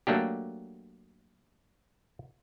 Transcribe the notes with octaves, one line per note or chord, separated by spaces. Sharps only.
F#3 A3 A#3 D4 G4